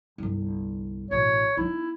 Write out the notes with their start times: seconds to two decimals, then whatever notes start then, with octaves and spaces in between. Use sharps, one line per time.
0.18 G1 C2
1.11 A1 B2 C#5
1.57 B3 D#4 E4